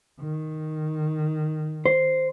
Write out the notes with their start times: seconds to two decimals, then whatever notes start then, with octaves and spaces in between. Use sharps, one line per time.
0.20 D#3
1.86 C5